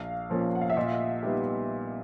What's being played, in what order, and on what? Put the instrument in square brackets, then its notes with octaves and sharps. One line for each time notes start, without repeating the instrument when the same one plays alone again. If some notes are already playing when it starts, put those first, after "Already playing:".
Already playing: [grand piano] A#1 [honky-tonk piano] F5
[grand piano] A#2 F3 A#3 C#4
[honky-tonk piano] F#5
F5
E5
[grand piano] A#2 [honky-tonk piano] D#5
[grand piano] G3 B3 D#4 G4